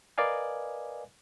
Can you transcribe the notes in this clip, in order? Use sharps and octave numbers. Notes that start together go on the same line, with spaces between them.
A#4 B4 D5 D#5 F5 G#5